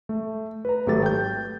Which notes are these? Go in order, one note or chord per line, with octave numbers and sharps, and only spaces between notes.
A3
B4 A#5
G#1 F#3 A3 G4 A4 A6
G5 G6